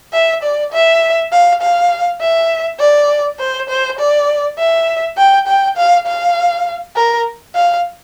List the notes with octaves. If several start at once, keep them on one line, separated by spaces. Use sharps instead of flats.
E5
D5
E5
F5
F5
E5
D5
C5
C5
D5
E5
G5
G5
F5
F5
A#4
F5